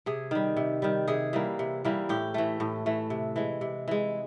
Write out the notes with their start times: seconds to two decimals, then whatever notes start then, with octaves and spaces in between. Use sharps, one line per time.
0.06 C3 G#4
0.31 D#3 G3
0.57 C3
0.82 D#3 G3
1.08 C3 G#4
1.33 E3 G3 A#3
1.59 C3
1.85 E3 G3 A#3
2.09 A2 G4
2.34 E3 A3
2.60 A2
2.86 E3 A3
3.10 C3
3.36 E3 G#3
3.61 C3
3.88 E3 G#3